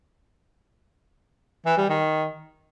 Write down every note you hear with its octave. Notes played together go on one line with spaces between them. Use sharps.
E3
G3
D#3